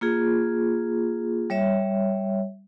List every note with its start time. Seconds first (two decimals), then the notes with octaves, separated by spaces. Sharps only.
0.01 A#3 F4 G#4
1.50 G3 C#5 E5